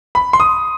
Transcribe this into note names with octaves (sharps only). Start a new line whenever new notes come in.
B5
C6
D#6